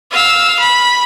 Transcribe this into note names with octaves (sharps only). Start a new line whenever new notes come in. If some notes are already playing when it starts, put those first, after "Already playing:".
F5 E6
B5